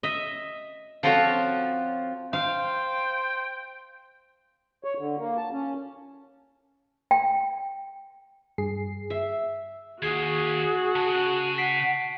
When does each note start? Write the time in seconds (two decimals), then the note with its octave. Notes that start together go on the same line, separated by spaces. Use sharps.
0.03 D#5 E5
1.03 F3 C4 F4 F#4 A4 C#5
2.33 C5 F5 G5
4.84 C#5
4.98 D3
5.18 A#3
5.37 A5
5.53 C#4
7.11 G5
8.58 G2 G#4 C7
9.10 E5
10.02 D#2 F#4 G#4 G#6 C7
10.96 C#3 A5
11.58 F#5 B6 C7 D7